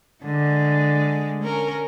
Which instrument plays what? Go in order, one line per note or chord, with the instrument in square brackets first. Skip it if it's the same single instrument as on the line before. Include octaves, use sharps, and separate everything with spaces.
[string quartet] D3 [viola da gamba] G#3
[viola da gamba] C#4 A#4